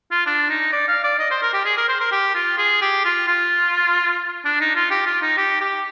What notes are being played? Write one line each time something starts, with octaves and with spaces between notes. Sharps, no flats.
F4
D4
D#4
D5
F5
D5
D#5
C5
A#4
G4
G#4
A#4
C5
A#4
G4
F4
G#4
G4
F4
F4
D4
D#4
F4
G4
F4
D#4
G4
G4